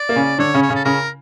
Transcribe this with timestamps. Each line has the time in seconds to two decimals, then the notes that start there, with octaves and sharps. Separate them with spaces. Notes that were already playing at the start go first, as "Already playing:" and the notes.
Already playing: D5
0.09 A#3
0.16 C#3 C#4
0.38 D3 D4 C#5
0.54 C#3 C#4
0.62 C#5
0.69 C#3 C#4
0.75 A4
0.85 C#3 C#4 A#4